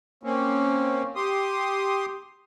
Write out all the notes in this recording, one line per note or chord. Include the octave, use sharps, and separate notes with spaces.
A#3 C4 C#4
G4 C6 D#6